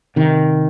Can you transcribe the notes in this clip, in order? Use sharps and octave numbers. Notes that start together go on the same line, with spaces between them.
C3 D#3